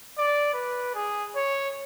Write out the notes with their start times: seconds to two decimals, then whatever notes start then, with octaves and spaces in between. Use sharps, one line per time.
0.18 D5
0.54 B4
0.95 G#4
1.36 C#5